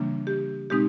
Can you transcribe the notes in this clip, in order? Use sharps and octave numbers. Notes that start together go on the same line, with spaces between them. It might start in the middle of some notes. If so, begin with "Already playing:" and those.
Already playing: C#3 E3 G3 A#3 D4
G4
B2 G#3 C4 D#4 G4